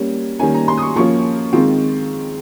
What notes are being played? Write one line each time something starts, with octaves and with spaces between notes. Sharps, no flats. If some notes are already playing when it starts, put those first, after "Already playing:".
Already playing: G3 A#3 C#4
D#3 G3 A#3 C#4 G#5
A#5
C6
D#6
C#6
F3 A#3 C#4 F4 C#6
D#3 G#3 C4 F4